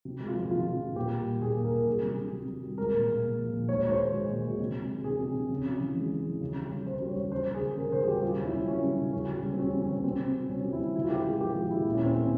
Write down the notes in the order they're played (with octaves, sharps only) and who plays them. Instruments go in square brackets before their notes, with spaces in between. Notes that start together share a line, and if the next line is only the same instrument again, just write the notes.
[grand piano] C3
G#3
F4
F3
C3 F4
C3
C3
A#2 G4
G3
A#2
A#2 G#4
A#2
A#4
A#2
G3 G#4
C3
C3
G3
G3
G3
G#3 A#4
A#2
A#2
A#2
F3
A#2
G#3 C#5
G#3 C#5
C5
G#3
G#3
A#2
G#3
C3
G#3
C3
C3 G#4
C3
C3
C#3
C#3
E3
G#3
C#3
E3
C#3
G3
C#3
C#3 C5
G3
C#5
G3
C#3 C5
C#3
G#4
C#3
C#3 A#4
C#3 C5
G#4
G3 G4
C#3 F4
G3 C#4
E4
C#3
G3 C#4
C#3
C#3
C#3 C#4
G3
C#3
C4
G3 C#4
C#3
C#4
C#3
C#4
C3 C4
C3
G3
C3 C#4
G3
E4
C3
C#3 E4
F4
C#3 G4
G#3 G#4
F3 G4
G#3 F4
G#3 E4
A#2 E4
C#4
A#2 C4
A#2 C#4